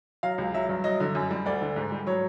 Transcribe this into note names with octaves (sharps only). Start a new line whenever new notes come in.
F#3 F5
C#2
F#3 E5
G2
F#3 D#5
D3
F#2
G3
D2 D5
D3
G#2
G3
F#3 C#5